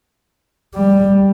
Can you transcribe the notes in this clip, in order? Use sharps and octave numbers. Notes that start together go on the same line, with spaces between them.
G3